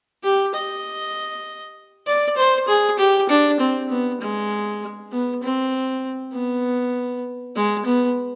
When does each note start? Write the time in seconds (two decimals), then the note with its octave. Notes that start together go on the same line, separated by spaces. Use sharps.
0.24 G4
0.55 D#5
2.07 D5
2.37 C5
2.68 G#4
2.99 G4
3.29 D4
3.60 C4
3.90 B3
4.21 G#3
5.12 B3
5.43 C4
6.34 B3
7.56 G#3
7.86 B3